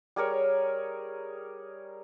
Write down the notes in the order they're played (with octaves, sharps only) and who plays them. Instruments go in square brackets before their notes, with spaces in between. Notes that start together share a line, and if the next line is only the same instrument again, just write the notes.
[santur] G3 G#4 A#4 C#5